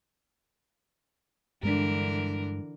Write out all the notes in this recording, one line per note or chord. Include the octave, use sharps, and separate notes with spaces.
G2 D3 E3 G#3 D4 A#4